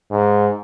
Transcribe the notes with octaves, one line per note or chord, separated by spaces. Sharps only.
G#2